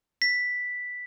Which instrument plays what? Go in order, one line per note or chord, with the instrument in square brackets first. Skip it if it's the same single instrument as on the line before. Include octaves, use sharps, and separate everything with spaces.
[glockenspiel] B6